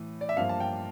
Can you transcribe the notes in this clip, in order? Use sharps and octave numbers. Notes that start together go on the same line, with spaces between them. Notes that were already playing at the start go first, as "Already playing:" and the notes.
Already playing: A2 E3
D5
E5
G2 F3 A#3 F5
A5
G5